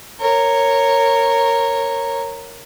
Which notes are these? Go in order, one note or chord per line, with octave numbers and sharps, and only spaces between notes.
A#4 C#5